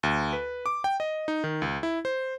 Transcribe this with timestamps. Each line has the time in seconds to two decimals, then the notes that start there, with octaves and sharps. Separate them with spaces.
0.03 D2
0.33 B4
0.66 D6
0.84 G5
1.00 D#5
1.28 D#4
1.44 D#3
1.62 C#2
1.83 E4
2.05 C5